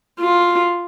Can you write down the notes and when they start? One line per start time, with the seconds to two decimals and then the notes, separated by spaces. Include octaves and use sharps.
0.20 F4